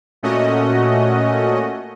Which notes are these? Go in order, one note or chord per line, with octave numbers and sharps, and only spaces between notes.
A#2 A3 C#4 F#4 D#5